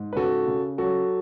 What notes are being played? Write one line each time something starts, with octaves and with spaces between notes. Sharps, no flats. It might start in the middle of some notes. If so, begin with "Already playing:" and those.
Already playing: G#2
B4
C#3 F#4 A4
C#3
F#3 F#4 A4